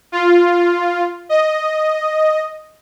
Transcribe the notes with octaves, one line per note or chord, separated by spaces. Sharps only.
F4
D#5